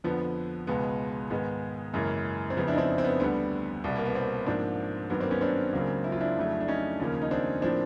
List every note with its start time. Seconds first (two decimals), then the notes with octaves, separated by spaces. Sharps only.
0.04 F2 D3 F3 B3
0.67 C#2 B2 G#3 B3
1.30 G#2 D#3 G#3 B3
1.94 F#2 C#3 E3 G#3 A#3
2.50 C4
2.57 F2 C#3 F3 B3
2.67 D4 E4
2.74 D#4
2.78 C4 D4
2.98 C4
3.04 B3
3.20 D2 D3 G3 B3
3.84 C2 B2 G3
3.96 A#3
4.05 B3
4.15 A#3 C4
4.46 G#2 F3 A#3 C4 D4
5.10 G2 D#3 F#3 A#3 B3
5.20 A#3 C4
5.31 B3 C#4
5.41 C4 D4
5.73 C#2 C#3 F#3 A#3
6.04 E4
6.12 F4
6.20 D4 E4
6.37 F2 C#3 F#3 A3
6.60 D4
6.68 C#4 D#4
7.00 D#2 C#3 F3 A#3
7.22 D#4
7.31 C4 D4
7.62 A2 F3 A#3 C4 D4